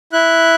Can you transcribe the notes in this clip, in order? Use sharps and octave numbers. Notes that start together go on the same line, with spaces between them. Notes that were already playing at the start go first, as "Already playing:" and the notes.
E4 F#6